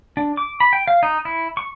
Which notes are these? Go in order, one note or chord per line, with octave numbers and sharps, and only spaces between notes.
D4
D6
B5
G5
F5
D#4
E4
C#6